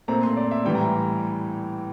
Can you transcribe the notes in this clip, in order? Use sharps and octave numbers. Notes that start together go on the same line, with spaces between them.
A#2 A3 C4 A#5
C6
D5
E5
A2 E3 G3 G5
A#5